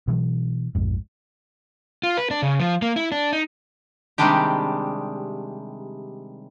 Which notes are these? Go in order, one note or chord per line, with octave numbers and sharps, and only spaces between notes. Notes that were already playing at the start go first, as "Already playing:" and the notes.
B2 E3 F#3
A#1 F2 G#2
F4
B4
D4
C#3
F3
A#3
E4
D4
D#4
C3 D#3 G3 G#3 D4 G4